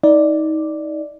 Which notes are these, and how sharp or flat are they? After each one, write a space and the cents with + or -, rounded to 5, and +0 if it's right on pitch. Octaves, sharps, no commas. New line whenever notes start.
D#4 +25 D5 +0